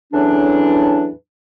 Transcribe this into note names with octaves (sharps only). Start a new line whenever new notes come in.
E2 A2 E3 F#3 C#4 D4